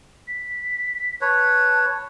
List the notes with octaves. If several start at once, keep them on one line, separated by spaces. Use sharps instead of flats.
B6
B4 C#5 A5